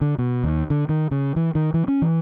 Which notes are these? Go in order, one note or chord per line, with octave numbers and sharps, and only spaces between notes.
D3
B2
D#2
D3
D#3
C#3
E3
D#3
E3
C#4
E3